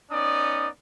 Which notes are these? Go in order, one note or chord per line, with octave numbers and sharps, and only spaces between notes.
B3 C#4 D#4 D5 D#6